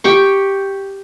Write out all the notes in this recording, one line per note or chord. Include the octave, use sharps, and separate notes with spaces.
G4 G5 C#6